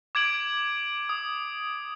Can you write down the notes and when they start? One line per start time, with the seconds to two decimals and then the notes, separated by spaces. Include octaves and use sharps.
0.15 D6 G#6 D7 F#7
1.09 D#6